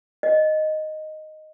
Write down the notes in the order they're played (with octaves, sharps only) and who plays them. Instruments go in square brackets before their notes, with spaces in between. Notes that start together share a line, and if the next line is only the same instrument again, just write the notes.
[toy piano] D#5